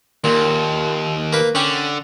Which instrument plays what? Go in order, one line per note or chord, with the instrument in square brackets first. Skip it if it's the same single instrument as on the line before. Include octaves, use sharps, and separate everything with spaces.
[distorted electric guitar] D#2 [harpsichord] A#2
[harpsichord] A#3 B4
[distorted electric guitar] D3 [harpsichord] C#4 G4